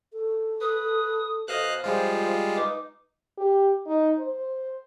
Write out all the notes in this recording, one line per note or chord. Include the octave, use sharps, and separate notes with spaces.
A4
B4 D#6
B2 C5 D#5 F5 F#6
F3 G3 G#3 F4
D#4 B4 D6
G4
D#4
C5